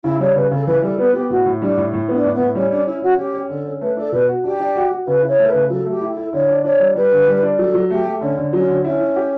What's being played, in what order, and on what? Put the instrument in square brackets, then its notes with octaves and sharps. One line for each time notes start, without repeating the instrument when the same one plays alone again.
[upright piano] C#3 [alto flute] E4
[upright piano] G3 [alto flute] C#5
[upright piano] C#3 [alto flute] B4
[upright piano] C#3 [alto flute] A4
[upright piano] E3 [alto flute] B4
[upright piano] G3 [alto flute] A4
[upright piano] B3 [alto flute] B4
[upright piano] B3 [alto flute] G4
[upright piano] A2 [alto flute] F#4
[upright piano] A2
[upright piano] G3 [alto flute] D4
[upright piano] A2
A2
B3
[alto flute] D4
[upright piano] A2
[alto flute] B3
[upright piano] A2
[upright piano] G3 [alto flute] C#4
[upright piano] C#4 [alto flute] D4
[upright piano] C#4 [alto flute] E4
[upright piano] C#4 [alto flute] F#4
[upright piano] C#4 [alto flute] G4
[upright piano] C#4
[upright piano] D3 [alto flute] A4
[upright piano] C#4
[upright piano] A3 [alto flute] B4
[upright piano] D4 [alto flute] A4
[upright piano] B2 [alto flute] B4
[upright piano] F#4
[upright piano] D4 [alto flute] G4
[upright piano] D4
F#4
F#4
[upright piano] C#3 [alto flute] B4
[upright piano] E4
[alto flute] C#5
[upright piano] A3
[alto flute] A4
[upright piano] C#3 [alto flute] B4
[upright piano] F#3 [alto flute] A4
[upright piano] A3
[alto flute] G4
[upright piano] E4
[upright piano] E4 [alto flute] A4
[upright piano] D3 [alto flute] C#5
[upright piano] D4
[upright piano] D4 [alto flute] C#5
[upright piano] G3
[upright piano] G3 [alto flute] B4
[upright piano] D3
G3
D4
[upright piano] F#3 [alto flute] A4
[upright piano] F#3
[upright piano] A3 [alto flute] G4
[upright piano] A3
[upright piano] D3 [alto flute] C#4
[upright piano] D3
[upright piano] F#3 [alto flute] C#4
[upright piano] D3
[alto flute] C#4 [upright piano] E4
[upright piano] E4
G4